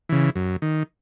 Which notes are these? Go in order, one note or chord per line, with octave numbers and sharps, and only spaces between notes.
C#3 E3
F#2
D#3